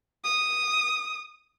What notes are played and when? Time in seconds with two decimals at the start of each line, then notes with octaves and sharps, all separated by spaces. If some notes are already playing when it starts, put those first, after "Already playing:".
0.24 D#6